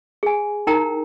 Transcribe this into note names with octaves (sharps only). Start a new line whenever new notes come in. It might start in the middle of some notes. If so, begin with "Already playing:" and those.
G#4 G#5
D#4 E4 A#4 G5 A#5